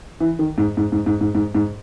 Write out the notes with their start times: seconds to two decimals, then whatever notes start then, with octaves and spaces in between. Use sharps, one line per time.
0.20 E3
0.39 D#3
0.58 G#2
0.77 G#2
0.92 G#2
1.06 G#2
1.21 G#2
1.35 G#2
1.55 G#2